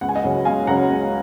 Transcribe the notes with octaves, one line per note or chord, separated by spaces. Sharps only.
C#2 F#5
G#5
D#5 F#5
C#3 F#3 C#4
C#2 F5 G#5
C#3 F#3 C#4 F#5 A#5
C#2